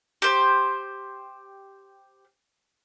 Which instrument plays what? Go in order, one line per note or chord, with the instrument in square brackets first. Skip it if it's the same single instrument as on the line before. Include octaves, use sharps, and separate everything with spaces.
[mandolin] G4 C5